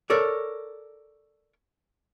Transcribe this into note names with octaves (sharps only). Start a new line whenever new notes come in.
A4 A#4 C#5 D5